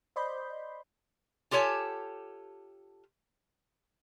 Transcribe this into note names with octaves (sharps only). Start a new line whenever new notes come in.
C5 D5 D#5 B5 C6 G6
F4 G4 A4 C#5 G#5